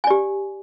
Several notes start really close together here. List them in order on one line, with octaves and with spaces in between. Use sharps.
G#5 D5 G4